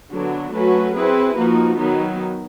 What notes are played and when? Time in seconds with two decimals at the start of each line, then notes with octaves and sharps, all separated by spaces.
0.12 D3 F#3 B3 D4 F#4
0.54 F#3 A3 C#4 F#4 B4
0.96 C4 E4 G#4 B4
1.37 F3 A#3 D#4 F#4
1.79 D#3 F#3 B3 D#4